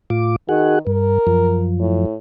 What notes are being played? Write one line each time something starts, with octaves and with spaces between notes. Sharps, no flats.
A2 F4 D6
D#3 F#4 G#4 F#5
G2 A#4
F#2 F3
A2